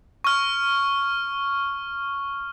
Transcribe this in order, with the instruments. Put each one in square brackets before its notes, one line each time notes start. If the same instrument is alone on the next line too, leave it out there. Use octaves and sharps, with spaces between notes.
[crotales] C#6 F6